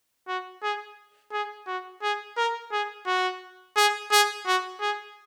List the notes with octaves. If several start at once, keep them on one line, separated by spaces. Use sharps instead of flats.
F#4
G#4
G#4
F#4
G#4
A#4
G#4
F#4
G#4
G#4
F#4
G#4